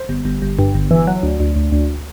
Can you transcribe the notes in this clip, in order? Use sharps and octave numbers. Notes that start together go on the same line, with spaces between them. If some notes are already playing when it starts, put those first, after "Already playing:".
Already playing: C5
G1
G1
G1
G2
G1
E3
F#3
D2
D2
D2
D2